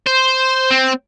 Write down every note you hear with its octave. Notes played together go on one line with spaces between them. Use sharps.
C5
C4